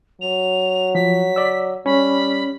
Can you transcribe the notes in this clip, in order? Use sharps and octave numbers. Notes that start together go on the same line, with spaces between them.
F#3 F7
F3 B6
D5 E6
G3 C#4 B5